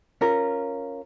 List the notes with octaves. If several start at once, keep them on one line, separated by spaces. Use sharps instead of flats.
C#4 F4 A#4